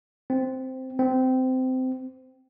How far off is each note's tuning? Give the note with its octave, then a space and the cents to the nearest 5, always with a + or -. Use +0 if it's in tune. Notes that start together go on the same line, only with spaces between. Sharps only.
C4 -5
C4 -20